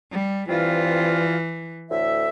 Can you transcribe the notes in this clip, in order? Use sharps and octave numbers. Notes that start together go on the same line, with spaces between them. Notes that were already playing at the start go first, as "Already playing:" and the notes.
G3
G2 E3 C4 F4
D2 A2 E5